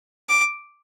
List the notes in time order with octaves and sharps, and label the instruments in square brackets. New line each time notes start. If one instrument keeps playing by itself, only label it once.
[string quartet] D6